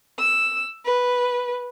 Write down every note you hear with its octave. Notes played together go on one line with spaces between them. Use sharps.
E6
B4